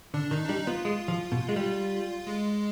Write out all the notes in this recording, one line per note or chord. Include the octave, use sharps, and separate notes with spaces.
D3 D4
D#3 D#4
D4
G3 D#4
B3 F4
G#3
F3
B2
G#3
G3
G#3